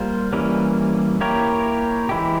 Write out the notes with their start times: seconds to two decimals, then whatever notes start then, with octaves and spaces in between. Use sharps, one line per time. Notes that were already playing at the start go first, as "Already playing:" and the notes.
Already playing: G3 A#3 F4 C5
0.33 E3 G3 A#3 C#4
1.21 A#3 E4 G4 A#4 C#5
2.09 E3 G#3 E4 G4